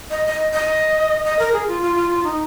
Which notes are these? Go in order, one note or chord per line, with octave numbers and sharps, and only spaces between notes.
D#5
D#5
D#5
D#5
A#4
G#4
F4
F4
F4
F4
D#4